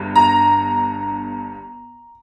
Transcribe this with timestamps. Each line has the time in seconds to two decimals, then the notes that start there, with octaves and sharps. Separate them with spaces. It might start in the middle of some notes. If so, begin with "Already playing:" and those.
Already playing: G1 G2
0.16 A#5